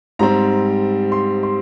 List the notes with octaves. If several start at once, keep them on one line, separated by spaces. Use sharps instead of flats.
G#2 G3 C4 A#5
C6
C6